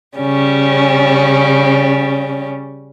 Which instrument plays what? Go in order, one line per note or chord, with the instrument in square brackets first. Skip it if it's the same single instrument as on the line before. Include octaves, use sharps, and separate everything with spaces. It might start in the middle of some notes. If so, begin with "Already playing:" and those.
[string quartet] C#3 G3 C#4